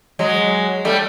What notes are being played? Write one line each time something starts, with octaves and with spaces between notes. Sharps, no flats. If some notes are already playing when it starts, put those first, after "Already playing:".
F#3 G#3
G3 A3